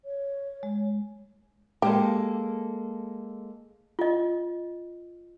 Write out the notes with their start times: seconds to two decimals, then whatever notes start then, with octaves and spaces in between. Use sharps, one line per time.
0.05 C#5
0.63 G#3
1.82 G#3 A#3 G4 A4
3.99 F4 D#5